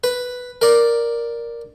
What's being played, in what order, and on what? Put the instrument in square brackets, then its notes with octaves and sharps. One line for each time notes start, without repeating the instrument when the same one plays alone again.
[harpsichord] B4
A#4 D5